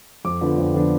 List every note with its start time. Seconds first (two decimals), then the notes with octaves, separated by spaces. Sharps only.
0.25 F2 D6
0.41 D3 F3 B3 D4
0.58 F2
0.74 D3 F3 B3 D4